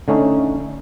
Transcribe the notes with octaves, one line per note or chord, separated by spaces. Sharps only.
D3 A3 C#4 D#4